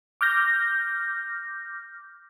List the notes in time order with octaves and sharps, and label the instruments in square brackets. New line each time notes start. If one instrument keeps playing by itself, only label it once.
[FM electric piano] D6 F6 G6 A#6